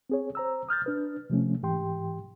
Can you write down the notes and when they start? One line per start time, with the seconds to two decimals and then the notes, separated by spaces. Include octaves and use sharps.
0.10 C4 G#4 C#5
0.35 C5 A#5 E6
0.69 D#6 F6 G6 A6
0.86 D4 B4
1.30 C3 F3 A3 C#4
1.62 G#2 E3 G4 G5 C6